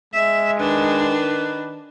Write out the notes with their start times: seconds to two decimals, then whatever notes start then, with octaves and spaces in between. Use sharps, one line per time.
0.14 G#3 E5
0.60 D#3 D4 B4